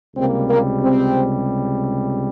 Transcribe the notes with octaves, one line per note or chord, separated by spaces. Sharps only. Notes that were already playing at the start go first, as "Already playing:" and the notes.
C#2 C3 G3 A#3 C4
A#3
C4